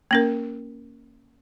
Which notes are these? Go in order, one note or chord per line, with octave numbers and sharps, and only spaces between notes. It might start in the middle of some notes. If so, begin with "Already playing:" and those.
A#3 C#4 A#4